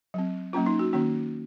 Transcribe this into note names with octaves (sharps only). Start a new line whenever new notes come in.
F#3 C4
F#3 A#3 C#4 F4
D#4
F#4
D#3 A#3 C#4 F#4